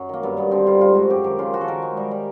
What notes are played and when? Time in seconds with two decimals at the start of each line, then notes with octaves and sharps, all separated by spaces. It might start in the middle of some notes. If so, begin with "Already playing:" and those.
Already playing: F#2 F#3
0.09 D#3 A#3
0.23 G2 B3
0.37 G2 B3
0.51 D3 C4
0.67 G3 F4
0.81 G#2 F4
0.95 G#2 F#4
1.10 F#2 G4
1.24 D#3 G4
1.39 C#3 F4
1.53 F3 F#4
1.61 A4
1.68 D#3 A#4
1.82 G#3
1.97 G3
2.11 G3